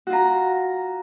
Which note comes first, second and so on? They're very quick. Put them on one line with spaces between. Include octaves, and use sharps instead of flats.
F#4 F4 A#5